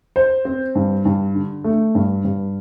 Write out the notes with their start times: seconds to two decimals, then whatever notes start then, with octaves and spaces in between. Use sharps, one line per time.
0.16 C5
0.45 C4
0.75 G2
1.05 G2
1.35 D3
1.64 A3
1.95 G2
2.25 G2